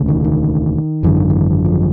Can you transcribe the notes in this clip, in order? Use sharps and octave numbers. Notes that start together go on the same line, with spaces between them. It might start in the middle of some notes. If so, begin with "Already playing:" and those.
Already playing: E1 D2 C#3
D#3
D#3
G#1 F#2 D3 E3
D#3
E3
F3